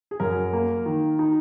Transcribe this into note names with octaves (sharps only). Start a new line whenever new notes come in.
G#4
F#2 A#4
A#3
D#3
D#4